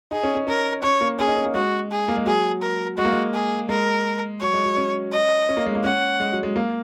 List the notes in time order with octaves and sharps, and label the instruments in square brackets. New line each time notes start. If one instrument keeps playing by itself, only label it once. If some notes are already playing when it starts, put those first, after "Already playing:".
[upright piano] D#4 [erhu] G#4
[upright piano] C#4
C#4
[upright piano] C#4 [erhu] A#4
[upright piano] C#4 [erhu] C#5
[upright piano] A#3
[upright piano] C#4 [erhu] G#4
[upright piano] D#4
C#4
A#3
[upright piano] G#3 [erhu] F#4
[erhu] G#4
[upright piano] A#3
G#3
[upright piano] F#3 [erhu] G#4
[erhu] A#4
[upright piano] G#3 [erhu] F#4
[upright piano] A#3
G#3
[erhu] G#4
[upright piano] G#3 [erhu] A#4
[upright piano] F#3 [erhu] C#5
[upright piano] G#3
F#3
C#4
[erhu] D#5
[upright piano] C#4
A#3
G#3
A#3
[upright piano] C#4 [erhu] F#5
[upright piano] G#3
F#3
G#3
A#3